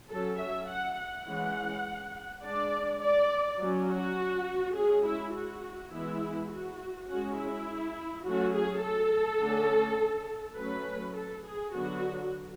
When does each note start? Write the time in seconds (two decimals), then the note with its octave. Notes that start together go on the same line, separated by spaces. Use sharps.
0.11 F#3 C#4 A4
0.39 E5
0.69 F#5
0.98 F#5
1.27 E3 G#3 C#4
2.43 G#3 D4 D5
3.02 D5
3.59 F#3 C#4
3.88 F#4
4.75 G#3 C#4 G#4
5.05 E4
5.33 F#4
5.91 E3 G#3 B3 E4
6.50 F#4
7.08 G#3 C#4 F#4
7.37 E4
8.25 F#3 A3 C#4 F#4
8.54 G#4
8.82 A4
9.41 D3 A3 C#4
10.57 F#3 A3 C#4 B4
11.16 A4
11.45 G#4
11.73 D3 F#3 B3 F#4